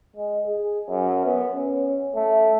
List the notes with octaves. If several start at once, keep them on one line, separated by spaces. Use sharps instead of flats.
G#3
G#4
F#2
B3
C#4
A3